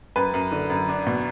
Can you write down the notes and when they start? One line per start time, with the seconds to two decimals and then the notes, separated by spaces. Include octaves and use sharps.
0.16 F#2 B4
0.34 F#2
0.52 D3
0.70 F#2
0.89 D4
1.07 B2